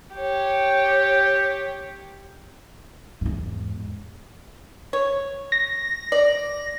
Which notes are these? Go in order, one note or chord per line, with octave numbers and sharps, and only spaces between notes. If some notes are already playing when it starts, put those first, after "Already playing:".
G4 C#5
E2 G#2
C#5
A#6
D5